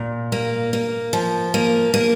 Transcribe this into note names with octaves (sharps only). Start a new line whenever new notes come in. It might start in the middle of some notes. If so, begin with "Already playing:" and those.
Already playing: A#2
A#3
A#3
F3
A#3
A#3